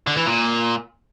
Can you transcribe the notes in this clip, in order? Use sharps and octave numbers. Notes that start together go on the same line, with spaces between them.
D3
E3
A#2